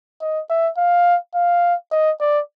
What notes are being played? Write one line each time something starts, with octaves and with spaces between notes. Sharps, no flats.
D#5
E5
F5
F5
D#5
D5